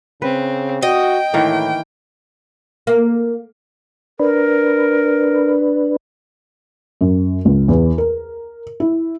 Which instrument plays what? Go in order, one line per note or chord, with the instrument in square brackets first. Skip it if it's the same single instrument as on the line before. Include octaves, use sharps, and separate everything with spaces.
[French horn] C#3 [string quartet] C4 [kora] B4
[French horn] F#4 [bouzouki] D#5 [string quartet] G5
[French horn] A2 [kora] D#3 E3 A#3
[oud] A#3
[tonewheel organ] D4 B4 [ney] A#4
[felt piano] F#2
C#2
E2
A#4
E4